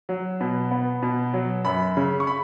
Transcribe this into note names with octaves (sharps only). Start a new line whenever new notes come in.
F#3
B2
B3
B2
F#3
F#2 B5
C#3
C#6
B5